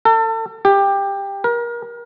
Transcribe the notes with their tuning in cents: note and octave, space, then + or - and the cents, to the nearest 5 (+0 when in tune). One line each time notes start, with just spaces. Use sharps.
A4 +35
G4 +15
A#4 +30